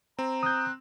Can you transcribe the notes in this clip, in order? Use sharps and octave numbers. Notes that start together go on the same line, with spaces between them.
C4 A#5
D#6 F#6 G6